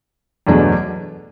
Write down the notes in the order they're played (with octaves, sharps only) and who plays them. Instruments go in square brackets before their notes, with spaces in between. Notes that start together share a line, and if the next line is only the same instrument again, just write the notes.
[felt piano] E2 B2 F#3 A3 D4